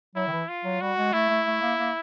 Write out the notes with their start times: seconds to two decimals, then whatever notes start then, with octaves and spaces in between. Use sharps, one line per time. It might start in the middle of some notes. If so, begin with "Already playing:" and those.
0.16 F#3 E4
0.27 D#3
0.32 E3
0.48 F4
0.65 F#3
0.81 G3 F#4
0.98 G#3
1.13 A3 E4
1.30 A3
1.47 A3
1.62 A#3
1.79 A#3